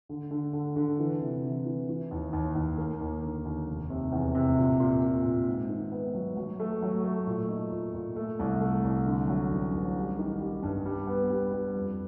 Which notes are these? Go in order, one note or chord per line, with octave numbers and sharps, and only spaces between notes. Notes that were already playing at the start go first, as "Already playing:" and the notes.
D3
D3
D3
D3
E3
C3
E3
E3
E3
D#2
D#2
D#2
A#3
D#2
D3
D#2
F1
C3
E2
C3
A#2
A#2
A#2
A#2
G#2
D#3
B3
F#3
F#3
A3
F#3
A3
A#2
D#4
A#2
A#2
A3
C2
A3
C2
D3
F#3
A1
A1
G3
D#3
G3
G2
G3
B3
G3
G3
F2